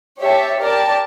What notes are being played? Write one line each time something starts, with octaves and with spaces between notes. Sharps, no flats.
G4 C#5 E5 A5
G4 A#4 D5 A5